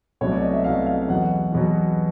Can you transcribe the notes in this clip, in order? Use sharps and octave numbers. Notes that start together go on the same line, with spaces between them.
C2 B2 F#3 A3 C#4 C#5
D5
D#5
E5
C2 B2 F#3 A3 C#4 F5
F5
E2 B2 F#3 F#5
E2 B2 F#3